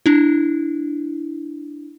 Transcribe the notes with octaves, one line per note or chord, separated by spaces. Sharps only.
D4 E4